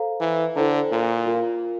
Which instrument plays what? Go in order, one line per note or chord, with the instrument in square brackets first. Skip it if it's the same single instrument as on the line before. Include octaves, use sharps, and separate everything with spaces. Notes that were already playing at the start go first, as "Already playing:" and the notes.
Already playing: [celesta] A4 C5 F5 A#5
[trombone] E3
[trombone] D3 [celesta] E4 A4 C5 G5 A#5
[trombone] A#2
[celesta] F4 A#4 F5